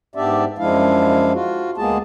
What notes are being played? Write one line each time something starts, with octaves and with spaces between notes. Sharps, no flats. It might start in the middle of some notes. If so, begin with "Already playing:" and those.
G#2 B3 D4 G4 D5 E5
F#2 F3 G#3 D4 E4 F5
F4 F#4
D2 G#3 A#3 B3 G#4 A5